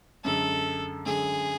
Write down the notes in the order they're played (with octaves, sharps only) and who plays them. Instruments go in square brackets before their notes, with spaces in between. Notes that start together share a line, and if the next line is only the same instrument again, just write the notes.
[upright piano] F#2 D3 G#3 [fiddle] A4
[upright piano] F#2 D3 G#3 [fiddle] G#4